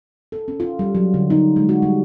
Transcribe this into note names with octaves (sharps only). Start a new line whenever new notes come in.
A4
C#4
F4
G3
F#3
D3
D#4
G#3
F#4
G3